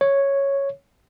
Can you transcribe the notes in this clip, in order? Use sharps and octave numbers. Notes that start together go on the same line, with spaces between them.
C#5